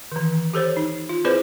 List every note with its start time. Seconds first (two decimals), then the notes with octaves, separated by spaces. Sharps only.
0.12 D#3 E3
0.53 G4 A4 C5 C#5
0.77 D#4
1.09 F4
1.25 C4 E4 G#4 B4 C5 D5